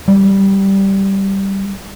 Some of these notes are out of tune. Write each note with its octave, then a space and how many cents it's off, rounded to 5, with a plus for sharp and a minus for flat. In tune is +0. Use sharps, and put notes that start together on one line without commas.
G3 -5